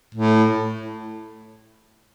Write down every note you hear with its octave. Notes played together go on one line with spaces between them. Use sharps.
A2